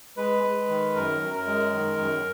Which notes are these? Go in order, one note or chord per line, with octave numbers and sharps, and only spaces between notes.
G#3 B4
G#3
D#3
F#2 A#4
F#2
A#4
G#3
D#3
F#2